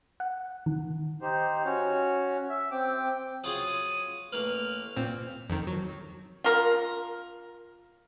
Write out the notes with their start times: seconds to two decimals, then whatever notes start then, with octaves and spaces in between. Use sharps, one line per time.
0.20 F#5
0.66 D#3
1.21 D#4 G4 C5
1.65 C#4 F#4 C#5
2.49 E5
2.71 C4 G5 D6
3.44 F#3 F4 G#4 D#6
4.32 A1 A#3 B4 F6
4.97 A#2 C4
5.49 F2 D#3
5.67 F#3
6.44 F4 A#4